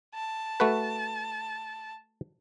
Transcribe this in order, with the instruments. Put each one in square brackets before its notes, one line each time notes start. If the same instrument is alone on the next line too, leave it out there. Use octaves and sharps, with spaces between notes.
[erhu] A5
[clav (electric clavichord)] A3 F#4 B4